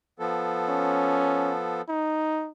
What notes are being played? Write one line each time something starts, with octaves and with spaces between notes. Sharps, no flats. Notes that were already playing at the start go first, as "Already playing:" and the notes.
F3 B3 A4
C#4
D#4